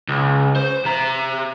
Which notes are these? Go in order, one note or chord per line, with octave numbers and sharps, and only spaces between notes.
C#2
C5
C3 A#5